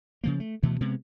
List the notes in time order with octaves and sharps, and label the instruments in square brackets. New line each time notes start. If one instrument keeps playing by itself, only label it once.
[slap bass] C#3 F3 A#3
A3
D2 B2 E3 A3
C3 G#3 B3